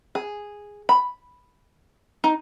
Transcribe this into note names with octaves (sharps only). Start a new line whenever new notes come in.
G#4
B5
D#4